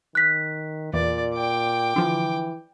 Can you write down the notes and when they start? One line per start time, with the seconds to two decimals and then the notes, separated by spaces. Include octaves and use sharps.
0.15 D#3 F#6 B6
0.93 E2 A#2 D5
1.34 G5 D6
1.96 D3 E3 F3